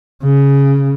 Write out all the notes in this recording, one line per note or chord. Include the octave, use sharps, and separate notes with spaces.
C#3